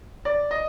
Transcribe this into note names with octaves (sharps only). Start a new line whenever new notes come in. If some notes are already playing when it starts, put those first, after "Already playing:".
D5
D#5